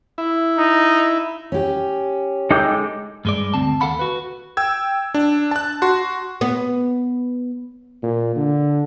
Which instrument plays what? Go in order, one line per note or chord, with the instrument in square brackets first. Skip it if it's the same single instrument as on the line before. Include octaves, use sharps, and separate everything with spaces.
[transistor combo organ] E4
[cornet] D#4
[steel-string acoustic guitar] C#4 G4
[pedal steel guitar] G#3 D6 [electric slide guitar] D#4 A4 G5
[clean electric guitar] G2 G#3 D5
D2 C4 A5
D#2 A4 F5 F#5 B5
F#4 B4
[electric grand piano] G5 E6 G#6
D4
A5 F#6
F#4 C6 F#6
[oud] B3
[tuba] A#2
D3